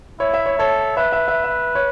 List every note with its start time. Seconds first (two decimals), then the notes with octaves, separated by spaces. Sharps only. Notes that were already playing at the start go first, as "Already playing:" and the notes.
0.20 E4 C#5
0.34 E5
0.46 C#5
0.59 A4 C#5
0.97 B4 E5
1.12 E5
1.28 E5
1.44 E5
1.75 C#5